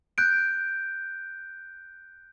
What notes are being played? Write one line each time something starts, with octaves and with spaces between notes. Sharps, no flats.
F#6 G6 D7